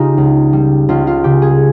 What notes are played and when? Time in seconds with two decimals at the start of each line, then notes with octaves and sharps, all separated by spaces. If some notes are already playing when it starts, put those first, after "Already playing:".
Already playing: C#3 D#4 F4 G4
0.17 C#2
0.53 G3
0.89 C#2 F4
1.07 F4
1.24 C#3 G4
1.42 G#4